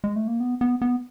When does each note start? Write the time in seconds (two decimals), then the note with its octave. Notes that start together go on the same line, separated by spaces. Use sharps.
0.04 G#3
0.16 A3
0.28 A#3
0.40 B3
0.61 B3
0.82 B3